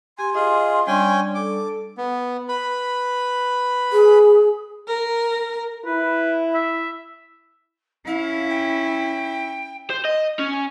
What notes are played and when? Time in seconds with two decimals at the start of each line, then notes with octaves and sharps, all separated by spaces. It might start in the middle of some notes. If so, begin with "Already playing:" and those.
0.19 G4 G#5 C6
0.35 F4 G#4 D#5
0.87 G3 C#4 D4 D5 G5 G#5
1.35 A4 D6
1.98 B3
2.49 B4 B5
3.93 G#4
4.88 A#4
5.85 E4 B4
6.54 E5
8.06 C#4 E4 F5
8.49 G5
9.90 C5
10.05 D#5
10.39 C#4